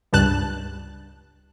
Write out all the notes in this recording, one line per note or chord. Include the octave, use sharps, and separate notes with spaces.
C#2 G2 A5 F#6